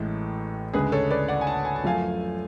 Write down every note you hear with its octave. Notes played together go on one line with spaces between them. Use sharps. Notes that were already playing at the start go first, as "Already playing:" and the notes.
Already playing: A1 A2 G#3 A4
D2 C#3 G#3 G#4 B4
A4 C#5
B4 D5
D5 F#5
G#5
F#5 A5
G#5
A5
F#2 F3 A3 F5 G#5